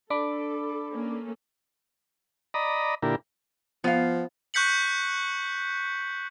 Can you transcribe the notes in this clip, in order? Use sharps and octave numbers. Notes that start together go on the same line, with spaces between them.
D4 A4 B5 D6
A#3 C#4 A4
D5 D#5 A#5 B5 D#6
A#2 D3 E4 G4 A#4
F3 B3 F5
C#6 F#6 G6 B6 C#7 F#7